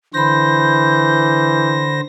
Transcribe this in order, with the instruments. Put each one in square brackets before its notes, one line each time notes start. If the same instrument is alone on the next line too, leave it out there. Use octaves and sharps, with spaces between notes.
[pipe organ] D3 C5 A#6 [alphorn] E3 [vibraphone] B5 C6 [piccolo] G6